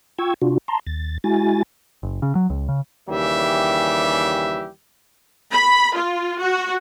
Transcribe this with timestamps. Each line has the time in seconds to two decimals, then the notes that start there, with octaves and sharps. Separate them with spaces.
0.19 F4 G5 C#6 E6 G#6
0.42 C3 D4 F4 F#4
0.68 A5 A#5 C6
0.87 D#2 A6
1.24 G#3 E4 F#4 G#5 A6
2.03 F#1
2.22 C#3
2.35 F#3
2.50 C#2
2.69 C#3
3.08 D#2 C#3 E3 G3 G4 E5
5.52 B5
5.94 F4
6.39 F#4